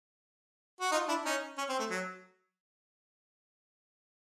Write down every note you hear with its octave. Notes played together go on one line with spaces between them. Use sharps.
F#4
D#4 F4
D4 E4
C#4 D#4
C#4
C4
A3
F#3